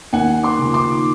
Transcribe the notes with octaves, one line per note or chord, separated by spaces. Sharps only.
D#2 F#5 G#5
C6 D6
C#3 F3
C6 D6